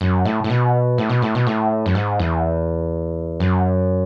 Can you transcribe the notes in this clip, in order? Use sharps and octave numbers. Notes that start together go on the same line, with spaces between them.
F#2
A2
A2
B2
A2
B2
A2
B2
A2
F#2
G#2
E2
F#2